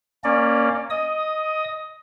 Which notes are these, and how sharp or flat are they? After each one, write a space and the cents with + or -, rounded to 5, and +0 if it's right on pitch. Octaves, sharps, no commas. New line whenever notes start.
A#3 +0 C#4 +0 D5 +20
D#5 +0 D#6 +15